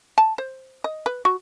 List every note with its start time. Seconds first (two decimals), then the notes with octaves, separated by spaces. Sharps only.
0.18 A5
0.38 C5
0.84 D#5
1.06 B4
1.25 F#4